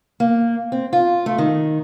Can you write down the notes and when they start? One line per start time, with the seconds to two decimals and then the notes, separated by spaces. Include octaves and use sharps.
0.20 A#3
0.72 C4
0.93 F4
1.26 A3
1.38 D#3